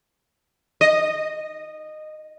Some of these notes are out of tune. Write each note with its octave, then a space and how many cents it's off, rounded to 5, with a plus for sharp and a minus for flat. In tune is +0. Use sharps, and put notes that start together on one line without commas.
D#5 -15